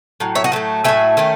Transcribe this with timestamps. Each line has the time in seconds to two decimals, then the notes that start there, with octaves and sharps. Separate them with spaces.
0.20 A2 F#3
0.35 C#5 E5
0.44 D#5 F#5
0.52 A2 F#3 A3
0.84 A2 F#3 A3 E5 G#5
1.17 D#3 A3 C#4